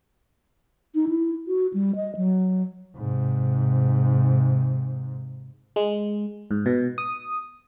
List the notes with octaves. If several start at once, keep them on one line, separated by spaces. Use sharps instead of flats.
D#4
E4
F#4
G3
D#5
F#3
G#2 C3
G#3
G#2
B2
D#6